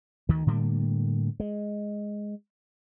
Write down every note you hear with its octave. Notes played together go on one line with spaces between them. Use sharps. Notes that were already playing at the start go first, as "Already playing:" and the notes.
D2 D#3
A2 D3 G3 A#3
G#3